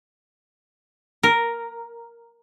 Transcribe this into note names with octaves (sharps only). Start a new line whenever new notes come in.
A#4